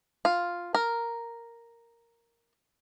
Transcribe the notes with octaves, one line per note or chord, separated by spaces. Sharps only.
F4
A#4